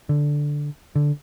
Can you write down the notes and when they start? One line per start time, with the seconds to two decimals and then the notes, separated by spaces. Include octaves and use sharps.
0.09 D3
0.96 D3